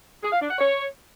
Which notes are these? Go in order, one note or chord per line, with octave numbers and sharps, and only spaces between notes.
G#4
F5
D4
F#5
C#5